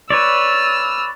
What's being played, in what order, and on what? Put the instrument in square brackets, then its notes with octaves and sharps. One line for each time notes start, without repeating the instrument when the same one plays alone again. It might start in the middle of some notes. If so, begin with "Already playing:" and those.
[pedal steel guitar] B4 C#5 D5 [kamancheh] E6 F6